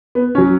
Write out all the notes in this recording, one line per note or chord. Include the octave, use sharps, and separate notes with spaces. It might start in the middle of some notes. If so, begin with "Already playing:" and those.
B3
F#3 C#4